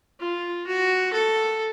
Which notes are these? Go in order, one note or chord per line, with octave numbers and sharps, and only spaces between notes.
F4
F#4
A4